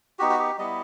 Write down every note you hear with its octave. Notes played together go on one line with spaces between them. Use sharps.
B3 D#4 F#4 G4
F#4
G4
G3 B3 E4 D#5